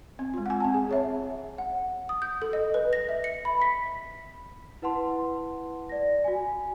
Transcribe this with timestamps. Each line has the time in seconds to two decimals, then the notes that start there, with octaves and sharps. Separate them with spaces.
0.19 C4
0.34 G#3 F4
0.46 F#5 G#5
0.60 C4 A5
0.74 G#4
0.89 G#4 C#5 E5
1.58 F#5
2.09 D#6
2.22 G6
2.42 A4
2.53 D#5
2.74 B4
2.93 A#6
3.09 E5
3.24 C#7
3.45 B5
3.62 B6
4.82 E4 B4 F#5 A5 C6
5.89 D5 A#6
6.24 F#4 G#5